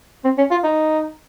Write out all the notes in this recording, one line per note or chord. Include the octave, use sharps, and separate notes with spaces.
C4
C#4
F4
D#4